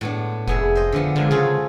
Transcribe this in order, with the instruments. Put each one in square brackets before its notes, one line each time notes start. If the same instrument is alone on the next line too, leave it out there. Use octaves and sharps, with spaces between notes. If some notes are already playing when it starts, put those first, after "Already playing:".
[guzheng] A2 B3 D4
[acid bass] F1 [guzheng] B3 G#4 E5
[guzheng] C5 D#5
D3 F3 B3
[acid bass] D3 [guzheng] F3 G#3 A#4
[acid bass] C#3 [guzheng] F4 G#4 A4